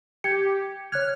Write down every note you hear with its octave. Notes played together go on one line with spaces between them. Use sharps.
G4 G#6 C#7
C#5 F6 F#6 G#6